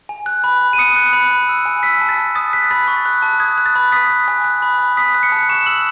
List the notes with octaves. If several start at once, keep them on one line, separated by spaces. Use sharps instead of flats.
G#5
F#6
B5
B5
D#7
D#6 C#7
F#6
B5
B5
E6
G#5
E6 B6
A5
A6
A5
D#6 A6
F#6 B6
B5 A6
C#6
F#6
A5
D#6 G#6
F#6
A6
B5
D#6 B6
F#6
G#5
F#6
B5
B5
D#6 B6
F#6
C#7
A5
C#6 E7
E6 F#7